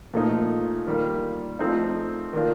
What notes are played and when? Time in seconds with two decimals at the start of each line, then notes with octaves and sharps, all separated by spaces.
0.13 A#2 F3 A3 D#4
0.86 D#3 G3 A#3 F4
1.59 F3 A3 C4 D#4
2.33 D#3 A#3 D4 F4